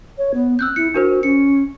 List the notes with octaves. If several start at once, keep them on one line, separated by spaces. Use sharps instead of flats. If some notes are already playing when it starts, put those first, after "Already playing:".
C#5
B3
C4 E6 F#6 G6
E4 C#7
D4 F#4 A#4 C5
C#4 C#7